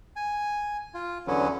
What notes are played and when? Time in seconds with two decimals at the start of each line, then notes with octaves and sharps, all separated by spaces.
0.16 G#5
0.94 F4
1.27 E2 D3 F#3 B3 C#4